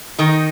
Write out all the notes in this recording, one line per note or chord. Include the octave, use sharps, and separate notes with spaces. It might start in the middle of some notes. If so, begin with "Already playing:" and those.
D#3 D#4